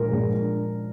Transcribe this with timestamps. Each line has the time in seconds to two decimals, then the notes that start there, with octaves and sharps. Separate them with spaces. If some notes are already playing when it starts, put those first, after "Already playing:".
Already playing: A#2 F3 G#3 A#4
0.10 A#2 F3 G#3